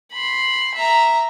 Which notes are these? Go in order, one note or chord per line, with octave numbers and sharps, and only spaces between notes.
B5 C6
E5 A#5